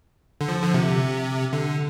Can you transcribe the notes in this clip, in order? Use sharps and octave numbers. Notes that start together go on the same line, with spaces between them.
D3
F3
D3
C3
D3